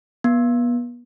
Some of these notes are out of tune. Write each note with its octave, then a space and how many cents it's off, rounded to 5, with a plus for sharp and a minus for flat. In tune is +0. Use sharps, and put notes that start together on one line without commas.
B3 -35